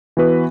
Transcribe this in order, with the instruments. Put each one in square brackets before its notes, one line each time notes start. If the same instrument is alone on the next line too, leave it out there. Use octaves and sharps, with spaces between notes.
[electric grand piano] E3 B3 F#4 B4